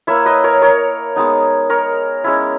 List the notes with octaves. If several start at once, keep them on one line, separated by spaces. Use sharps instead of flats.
A#3 E4 C#5 E5
B4 D#5
A#4 C#5
A#4 C#5
G#3 B3 D#4
A#4 C#5
G#3 C#4 E4